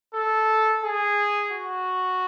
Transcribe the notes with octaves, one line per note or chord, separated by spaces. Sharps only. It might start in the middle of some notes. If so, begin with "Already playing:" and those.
A4
G#4
F#4